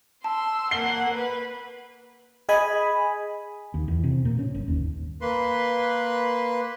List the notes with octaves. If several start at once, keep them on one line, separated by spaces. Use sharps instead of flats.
A5 C6 E6
A#3 F#5 C7 G7
B4
G#4 D#5 G#5 B5
D#2
E2
C3
A#2
C#4
G1
D#2
A#3 B4 C6